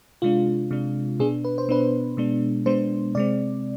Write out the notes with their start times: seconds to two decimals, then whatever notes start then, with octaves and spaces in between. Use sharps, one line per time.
0.22 C3 G#3 D4 F4
0.71 C3 G#3 D4
1.19 B2 B3 D4 G#4
1.44 B4
1.58 C5
1.69 B2 B3 D4 B4
2.17 B2 G#3 B3 D4
2.66 B2 G#3 B3 D4 C5
3.15 C3 G#3 C4 D5